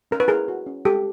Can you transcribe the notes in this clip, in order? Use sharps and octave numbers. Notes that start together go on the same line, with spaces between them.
C#4 A#4
B4
E4 G#4 A#4
F#4
C#4
G#3 G4 A4